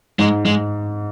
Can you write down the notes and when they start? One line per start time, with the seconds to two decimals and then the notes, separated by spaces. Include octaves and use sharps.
0.19 G#2 G#3
0.45 G#2 G#3